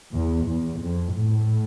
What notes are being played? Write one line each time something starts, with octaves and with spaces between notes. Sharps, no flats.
E2
E2
F2
A2